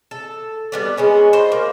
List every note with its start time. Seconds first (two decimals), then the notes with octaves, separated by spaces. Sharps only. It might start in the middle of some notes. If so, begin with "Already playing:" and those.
0.11 A4
0.72 G3 B3 D4
0.97 G#3 B3 C#4
1.33 C5 D#5
1.52 A#3